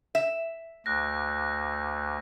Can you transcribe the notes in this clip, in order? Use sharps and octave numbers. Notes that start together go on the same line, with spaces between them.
E5
D2 F#6 A#6